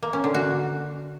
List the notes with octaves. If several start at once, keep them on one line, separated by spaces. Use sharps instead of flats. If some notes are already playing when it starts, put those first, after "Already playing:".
A#3
C#4
D3
F#4